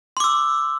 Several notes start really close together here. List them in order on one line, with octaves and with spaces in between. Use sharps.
C6 D6 E6